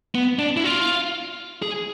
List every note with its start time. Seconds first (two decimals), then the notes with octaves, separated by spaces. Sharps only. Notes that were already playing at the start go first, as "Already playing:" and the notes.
0.15 B3
0.39 D4
0.57 E4
0.64 F4
1.62 G#4